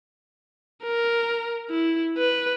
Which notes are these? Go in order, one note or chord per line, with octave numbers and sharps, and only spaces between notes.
A#4
E4
B4